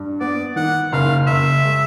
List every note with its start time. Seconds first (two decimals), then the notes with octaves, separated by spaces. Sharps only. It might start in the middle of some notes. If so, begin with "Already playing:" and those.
Already playing: G2
0.20 B3 D5
0.56 D#3 F#5
0.92 F#1 F5
1.27 F#1 E5
1.63 G#3